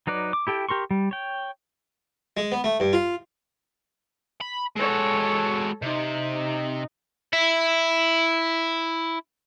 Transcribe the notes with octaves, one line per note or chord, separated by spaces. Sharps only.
F#3 D#4 B4 D5
D6
E4 G4 A4 G5
G4 A#4 C6 C#6
G3
C#5 G5
G#3
B3
A3
G2
F4
B5
G#3 F#4 A4 C#5
C3 D#4
E4 E5